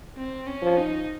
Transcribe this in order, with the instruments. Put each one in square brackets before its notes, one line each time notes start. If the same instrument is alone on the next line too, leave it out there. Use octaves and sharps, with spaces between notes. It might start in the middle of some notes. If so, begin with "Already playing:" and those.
[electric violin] C4
C#4
[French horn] F3
[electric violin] D#4